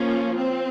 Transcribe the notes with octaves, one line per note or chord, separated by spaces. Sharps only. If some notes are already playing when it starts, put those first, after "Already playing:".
Already playing: F3 A#3 C#4 F4
C4